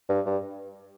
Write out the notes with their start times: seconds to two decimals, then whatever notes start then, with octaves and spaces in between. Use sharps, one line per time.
0.09 G2
0.26 G2